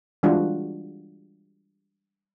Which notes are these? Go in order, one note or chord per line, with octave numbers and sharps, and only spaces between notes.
E3 G3 G#3 D4 F4 F#4